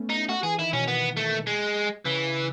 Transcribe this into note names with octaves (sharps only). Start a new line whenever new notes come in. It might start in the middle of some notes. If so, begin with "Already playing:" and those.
Already playing: A3 B3 C#4
D#4
A3 F#4
E3 G#4
D#3 E4
B2 C#4
B3
A3
G#3
C#3 E3